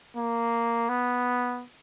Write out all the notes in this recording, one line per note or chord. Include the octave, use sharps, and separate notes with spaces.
A#3
B3